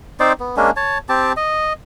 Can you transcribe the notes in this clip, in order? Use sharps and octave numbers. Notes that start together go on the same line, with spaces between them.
C4 D#4 C5 D5
B3
G#3 A#3 C#4 D4
C#5 A5
C4 G4 A5
D#5